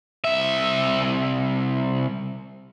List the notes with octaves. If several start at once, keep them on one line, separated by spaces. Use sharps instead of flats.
C2 E5